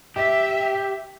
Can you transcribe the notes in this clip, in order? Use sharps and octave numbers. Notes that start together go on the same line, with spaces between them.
G4 E5